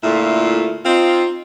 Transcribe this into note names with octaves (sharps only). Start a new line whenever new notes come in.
A#2 D3 A3 E4 F4
C4 D#4 F4